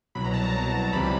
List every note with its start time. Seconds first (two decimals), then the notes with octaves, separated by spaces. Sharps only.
0.15 C2 B2 F#3 B5
0.24 A#5
0.33 A5
0.43 A#5
0.55 C2 B2 F#3
0.93 C#2 C3 E3 G3 B5